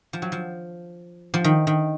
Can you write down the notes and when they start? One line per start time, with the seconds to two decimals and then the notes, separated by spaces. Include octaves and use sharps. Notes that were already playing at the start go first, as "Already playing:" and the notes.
0.13 F3
0.22 F#3
0.32 F3
1.34 F3
1.44 D#3
1.67 D#3